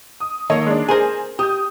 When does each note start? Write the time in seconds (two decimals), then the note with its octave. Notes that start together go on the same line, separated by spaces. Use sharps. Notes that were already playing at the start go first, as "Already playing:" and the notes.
0.20 D#6
0.50 D#3 A#3 A4 C#5 D#5
0.66 G#3 D4
0.89 G#4 A#4 C5 G#5
1.39 G4 D#6 G6